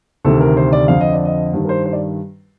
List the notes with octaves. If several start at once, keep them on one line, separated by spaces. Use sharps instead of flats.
D2 C3 D#3 A4
A#4
C5
D5
F2 D3 F5
D#5
D5
D#5
G2 D#3
A#4
C5
C5
D5